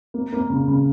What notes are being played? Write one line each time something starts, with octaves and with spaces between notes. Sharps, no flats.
A#3
A#3
C#3
C#3